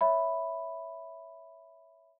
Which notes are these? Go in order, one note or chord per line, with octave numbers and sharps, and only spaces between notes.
C#5 E5 B5